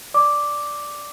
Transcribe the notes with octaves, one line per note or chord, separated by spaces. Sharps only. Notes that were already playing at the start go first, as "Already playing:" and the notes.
D5 D6